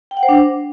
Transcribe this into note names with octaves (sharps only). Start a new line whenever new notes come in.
G5
F#5
C5
D4